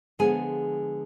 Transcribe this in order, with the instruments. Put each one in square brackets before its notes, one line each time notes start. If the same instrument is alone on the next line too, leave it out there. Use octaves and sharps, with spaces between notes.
[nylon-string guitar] D3 F3 G#3 B3 G#4 G#5